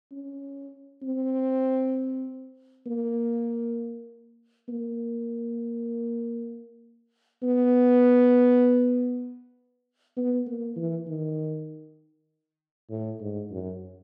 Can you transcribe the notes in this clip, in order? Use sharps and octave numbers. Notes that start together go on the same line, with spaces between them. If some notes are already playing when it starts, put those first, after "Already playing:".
C#4
C4
A#3
A#3
B3
B3
A#3
E3
D#3
A2
G#2
F#2